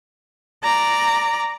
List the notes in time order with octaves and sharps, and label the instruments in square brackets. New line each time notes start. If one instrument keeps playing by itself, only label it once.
[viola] D5 A#5